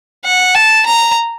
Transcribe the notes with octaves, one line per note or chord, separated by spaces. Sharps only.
F#5
A5
A#5